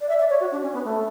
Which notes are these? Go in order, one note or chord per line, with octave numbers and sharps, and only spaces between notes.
D5
E5
D5
C#5
F#4
D4
C#4
B3
A3